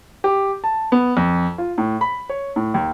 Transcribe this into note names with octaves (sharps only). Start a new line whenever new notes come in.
G4
A5
B3
F2
F4
A2
B5
C#5
A2
D#2